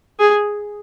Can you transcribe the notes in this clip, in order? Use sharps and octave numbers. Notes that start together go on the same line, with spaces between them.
G#4